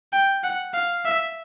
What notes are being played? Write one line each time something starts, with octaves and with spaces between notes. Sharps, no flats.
G5
F#5
F5
E5